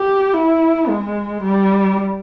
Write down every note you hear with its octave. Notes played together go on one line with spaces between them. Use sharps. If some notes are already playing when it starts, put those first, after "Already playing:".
Already playing: G4
E4
G#3
G3